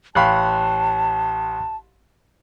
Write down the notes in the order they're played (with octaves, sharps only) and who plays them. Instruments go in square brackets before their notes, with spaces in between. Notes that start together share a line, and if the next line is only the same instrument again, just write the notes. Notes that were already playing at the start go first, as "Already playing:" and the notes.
[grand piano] A1 F5 B5 [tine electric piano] G5 C#6 F#6 [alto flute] A5